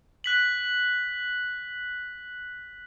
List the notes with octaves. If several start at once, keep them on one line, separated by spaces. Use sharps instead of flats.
F#6 B6 F#7